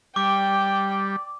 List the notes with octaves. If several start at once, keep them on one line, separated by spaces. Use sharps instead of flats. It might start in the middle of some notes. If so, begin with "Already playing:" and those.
G3 D5 G5 D6